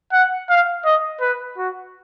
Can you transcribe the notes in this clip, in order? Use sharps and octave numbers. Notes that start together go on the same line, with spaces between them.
F#5
F5
D#5
B4
F#4